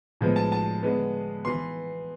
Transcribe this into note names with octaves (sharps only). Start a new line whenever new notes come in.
A2 F3 G#3 B3
A5
A5
D3 G#3 B3
E3 B3 C6